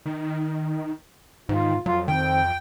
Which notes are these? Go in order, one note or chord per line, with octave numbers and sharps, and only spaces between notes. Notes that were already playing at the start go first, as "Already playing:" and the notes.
D#3
G#2 D#3 F4
F2 F#3 F4
D#3 C4 G5